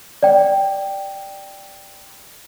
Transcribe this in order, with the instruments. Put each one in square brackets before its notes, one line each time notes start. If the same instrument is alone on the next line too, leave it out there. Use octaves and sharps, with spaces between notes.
[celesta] D5 G5